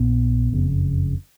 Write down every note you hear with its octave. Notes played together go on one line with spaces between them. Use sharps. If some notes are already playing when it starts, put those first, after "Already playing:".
Already playing: A#1 A#2 B3
F#1 F2 C#3